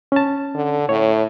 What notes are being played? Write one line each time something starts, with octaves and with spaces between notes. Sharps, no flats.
C#4 A5
D3
A2 C#5